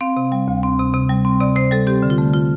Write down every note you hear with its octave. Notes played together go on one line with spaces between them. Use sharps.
C4 F5
C3
G3
D2
C4
C3
C3
G3
C4
C3 D5
C3 C5
G3 A4
C4 G4
D3
F4
A3
F4